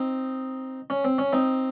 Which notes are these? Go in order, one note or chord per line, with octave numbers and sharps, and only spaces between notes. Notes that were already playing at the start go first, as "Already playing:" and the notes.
Already playing: C4 D#4
C#4
C4
C#4
C4 D#4